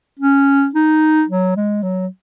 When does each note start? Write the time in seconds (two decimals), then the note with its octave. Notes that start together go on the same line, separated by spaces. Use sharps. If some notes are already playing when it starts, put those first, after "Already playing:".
0.19 C#4
0.75 D#4
1.29 F#3
1.56 G#3
1.83 F#3